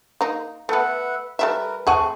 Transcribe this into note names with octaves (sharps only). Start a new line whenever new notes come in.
A#3 D#4
A3 B3 B4 E5 F#5
G3 A3 A#4 B4 E5
A3 C4 G#4 F#5 A5 C#6 D#7